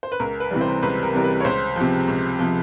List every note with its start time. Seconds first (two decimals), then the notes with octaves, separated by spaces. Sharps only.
0.03 C5
0.12 B4
0.20 C#2 A#4
0.40 B4
0.51 C3 E3 G3
0.61 C5
0.82 C#2 B4
1.03 A#4
1.14 C3 E3 G3 A#4
1.24 B4
1.40 C#5
1.44 C#2 C5
1.76 C3 F3
2.08 C#2
2.39 C3 F3